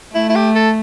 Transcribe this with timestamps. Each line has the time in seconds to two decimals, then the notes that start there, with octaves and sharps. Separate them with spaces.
0.15 A3 E4
0.29 E4
0.35 G4
0.55 A4